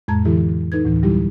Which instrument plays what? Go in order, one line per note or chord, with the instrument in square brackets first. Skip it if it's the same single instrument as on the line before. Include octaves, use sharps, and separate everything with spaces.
[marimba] F2 A2 G#3 A5 A#5 G#6
D3 E3 E4 G4 A4
D#4 A4 B4 G#6
D2 A2 E3
D3 F#3 G3 E4 G4